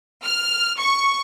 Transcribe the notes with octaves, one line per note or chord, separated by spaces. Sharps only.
F6
C#6